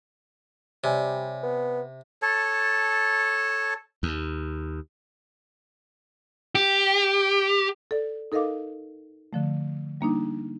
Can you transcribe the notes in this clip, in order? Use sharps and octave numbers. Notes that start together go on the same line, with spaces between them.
C3 G3 C#5 D5 G#5
B3
A4 C#5 A5
D#2
G4
A4 D5
D#4 A4 A#4 D#5 F5 D6
D3 F3 A3
G3 A#3 D4 D#4